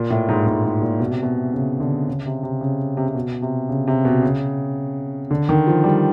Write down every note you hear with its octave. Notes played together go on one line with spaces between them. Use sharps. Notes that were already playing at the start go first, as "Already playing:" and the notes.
Already playing: A#2
A2
G#2
G#2
A2
A#2
B2
C3
B2
C#3
D3
C#3
C3
C3
C#3
C3
C3
B2
C3
C#3
C3
B2
C#3
D3
D#3
F3
G3